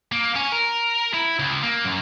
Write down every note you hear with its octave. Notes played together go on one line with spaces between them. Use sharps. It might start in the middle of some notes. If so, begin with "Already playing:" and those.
A#3
C#4
A#4
E4
C#2
A#3
F#2